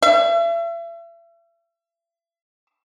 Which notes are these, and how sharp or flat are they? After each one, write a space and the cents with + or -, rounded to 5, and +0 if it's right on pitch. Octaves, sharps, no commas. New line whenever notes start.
E5 +40